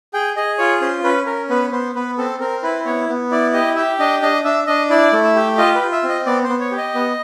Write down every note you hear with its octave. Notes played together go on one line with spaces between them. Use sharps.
G#4 G5
G#4 D#5
F4 C#5
C#4 C5
C#4 B4
C#4 A#4
B3 B4
B3 C5
B3 B4
C4 A4
C4 A#4
E4 B4
B3 C#5
B3
E4 D5
G4 D#5
G4 E5
D4 D#5
D4 D#5
D4 E5
D4 D#5
E4 D5
A3
E5
G4
F4 D#5
B4
F4
E5
C4
D#5
B3 D5
B3 C5
C#5
G4
D#5
B3